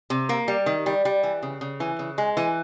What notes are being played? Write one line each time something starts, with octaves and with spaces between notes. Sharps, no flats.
C3
A#3
G3
D#3
G3
G3
E3
C#3
C#3
E3
C#3
G#3
E3